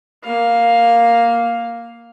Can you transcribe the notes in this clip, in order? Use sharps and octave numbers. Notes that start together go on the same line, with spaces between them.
A#3 F5